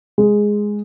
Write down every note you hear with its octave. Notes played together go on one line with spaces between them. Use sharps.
G#3